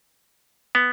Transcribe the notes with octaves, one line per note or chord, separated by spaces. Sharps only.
B3